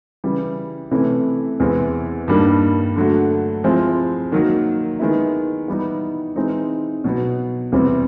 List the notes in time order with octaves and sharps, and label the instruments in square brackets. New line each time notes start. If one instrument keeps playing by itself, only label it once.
[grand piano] C#3 E3 G3
C3 E3 A3 C#4 E4
E2 C3 E3 G#3 C4
G2 D#3 G3 A#3 D4
D3 F#3 A3
F3 G#3 C4 E4
D#3 F#3 A#3
D#3 G#3 B3 E4
E3 G3 B3 D#4
E3 G#3 C4 D#4
B2 F#3 B3
E2 C3 E3 G3 C4